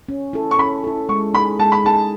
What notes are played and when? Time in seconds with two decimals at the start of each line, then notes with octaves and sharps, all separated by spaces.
0.09 C#4
0.33 E4 A4
0.51 C#6
0.59 C#4 B5
0.84 E4 A4
1.09 G#3 C#6
1.34 D#4 G#4 B5
1.59 G#3 A5
1.72 B5
1.85 D#4 G#4 A5